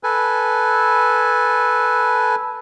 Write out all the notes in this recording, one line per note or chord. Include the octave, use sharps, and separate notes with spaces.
A4 B4 G#5